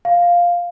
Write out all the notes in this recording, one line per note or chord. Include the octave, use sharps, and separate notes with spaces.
F5